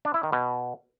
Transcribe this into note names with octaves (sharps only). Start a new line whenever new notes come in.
D4
E4
D#3
B2